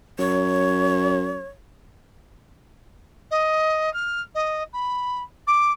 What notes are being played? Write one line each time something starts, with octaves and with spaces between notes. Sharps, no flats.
F#2 C#5
D#5
F6
D#5
B5
D6